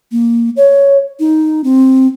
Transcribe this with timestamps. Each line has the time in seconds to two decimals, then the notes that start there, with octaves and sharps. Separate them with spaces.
0.12 A#3
0.57 C#5
1.20 D#4
1.64 C4